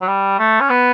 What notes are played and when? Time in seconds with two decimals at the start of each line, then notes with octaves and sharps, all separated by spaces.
0.01 F#3
0.08 G3
0.39 A3
0.61 C#4
0.70 B3